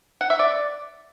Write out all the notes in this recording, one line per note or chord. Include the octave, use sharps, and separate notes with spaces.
F#5
E5
D5